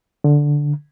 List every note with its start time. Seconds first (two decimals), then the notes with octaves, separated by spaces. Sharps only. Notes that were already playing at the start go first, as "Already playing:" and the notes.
0.24 D3